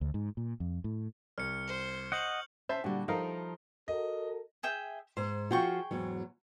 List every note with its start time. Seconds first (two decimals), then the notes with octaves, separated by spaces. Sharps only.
0.01 D2
0.14 G#2
0.37 A#2
0.60 F2
0.84 A2
1.38 C2 F6 C#7
1.67 C5
2.12 D#5 F#5 C#6 G6 F#7
2.69 C#4 C5 E5 A5
2.84 A#2 D3 G3 F#4
3.08 F3 D#4 E4 A4 A#4 F5
3.88 F#4 A4 A#4 D#5
4.63 G#4 E5 G5
5.17 G#2 C5
5.51 F3 F4 F#4 G#4 G5 C#6
5.91 E2 G#2 F#3